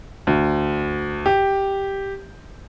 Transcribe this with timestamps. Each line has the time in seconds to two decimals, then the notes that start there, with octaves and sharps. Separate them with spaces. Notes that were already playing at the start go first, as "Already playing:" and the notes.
0.27 D2
1.26 G4